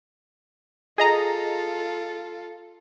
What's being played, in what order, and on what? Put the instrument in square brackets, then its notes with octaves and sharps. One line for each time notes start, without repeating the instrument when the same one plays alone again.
[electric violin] F4 A4 [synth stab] G#4 D#5 A#5